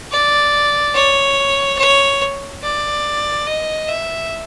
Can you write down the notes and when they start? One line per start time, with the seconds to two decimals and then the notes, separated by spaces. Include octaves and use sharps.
0.11 D5
0.94 C#5
1.78 C#5
2.63 D5
3.47 D#5
3.89 E5